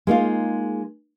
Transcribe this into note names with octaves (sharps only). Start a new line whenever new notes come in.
G#3 A#3 D#4 F4